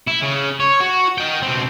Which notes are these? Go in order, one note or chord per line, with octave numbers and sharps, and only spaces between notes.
E4
C#3
C#5
F#4
D#5 G5
B2 C4